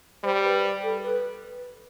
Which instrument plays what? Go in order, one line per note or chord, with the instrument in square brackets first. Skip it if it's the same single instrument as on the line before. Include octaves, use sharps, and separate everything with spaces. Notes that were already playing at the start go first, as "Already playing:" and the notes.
[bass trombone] G3 [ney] C5
[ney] B4
A4
B4